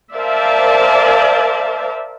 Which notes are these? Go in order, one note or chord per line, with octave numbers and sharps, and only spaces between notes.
A#4 C5 D5 E5 F5 A5